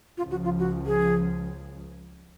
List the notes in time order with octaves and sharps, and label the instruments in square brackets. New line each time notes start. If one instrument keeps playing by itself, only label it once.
[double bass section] C#2 C#3 F3 [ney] F4
[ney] F#4
F4
F#4
G#4